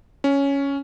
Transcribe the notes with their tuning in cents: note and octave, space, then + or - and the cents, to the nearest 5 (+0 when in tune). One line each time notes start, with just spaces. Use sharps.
C#4 +5